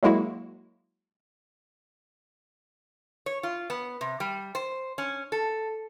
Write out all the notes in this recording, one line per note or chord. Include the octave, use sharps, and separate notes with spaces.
F#3 G#3 A#3 E4 F#4
C#5
F4
B3
C3
G3
C5
C#4
A4